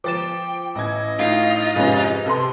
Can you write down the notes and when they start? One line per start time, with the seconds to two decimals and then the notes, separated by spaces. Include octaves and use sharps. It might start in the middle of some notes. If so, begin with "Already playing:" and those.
0.04 F3 G5 D6 A6 E7
0.75 A1 D#5 G#6
1.19 A2 D#4 F4 C7
1.76 F2 G#2 C3 C#4 B4
2.26 C3 A4 B4 C6